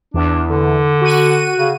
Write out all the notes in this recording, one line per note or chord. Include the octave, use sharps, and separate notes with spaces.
E2 D4
D3
F#4 D#7
C#3